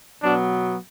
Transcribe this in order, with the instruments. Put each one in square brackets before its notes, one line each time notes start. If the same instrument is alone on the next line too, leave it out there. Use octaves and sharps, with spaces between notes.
[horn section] B2 F#3 B3 D4